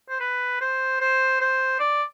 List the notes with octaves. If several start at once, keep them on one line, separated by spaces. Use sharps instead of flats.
C5
B4
C5
C5
C5
D5